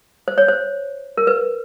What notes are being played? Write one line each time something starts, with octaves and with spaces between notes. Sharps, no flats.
C5
C#5
C5
A#4
B4